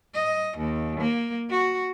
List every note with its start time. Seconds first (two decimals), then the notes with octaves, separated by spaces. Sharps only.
0.14 D#5
0.58 D#2
1.00 A#3
1.50 F#4